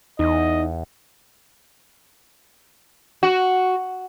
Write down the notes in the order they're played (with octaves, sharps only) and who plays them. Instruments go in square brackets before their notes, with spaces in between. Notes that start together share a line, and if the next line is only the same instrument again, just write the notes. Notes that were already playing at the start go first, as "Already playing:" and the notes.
[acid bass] E2 [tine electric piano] D#4 [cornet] D#5
[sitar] F#4